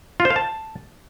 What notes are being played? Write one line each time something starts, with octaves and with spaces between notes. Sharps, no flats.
F4
C5
F5
A5